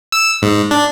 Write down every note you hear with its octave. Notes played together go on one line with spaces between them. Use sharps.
E6
G#2
D4